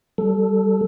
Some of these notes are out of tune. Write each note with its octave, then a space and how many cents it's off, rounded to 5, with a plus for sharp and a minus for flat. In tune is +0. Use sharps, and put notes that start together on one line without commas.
G3 -15 A4 +0